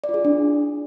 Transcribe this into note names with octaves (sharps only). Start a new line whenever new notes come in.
D5
F4
G#4
E4
D4